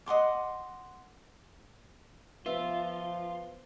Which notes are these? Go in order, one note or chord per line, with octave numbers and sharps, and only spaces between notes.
D#5 F#5 C6 D6
F3 B3 F4 E5